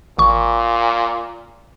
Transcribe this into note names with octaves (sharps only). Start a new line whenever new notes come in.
G#1 A#2 C#6